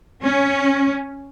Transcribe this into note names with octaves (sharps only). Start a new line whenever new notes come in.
C#4